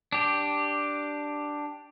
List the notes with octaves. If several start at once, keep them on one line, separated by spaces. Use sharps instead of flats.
D4 G4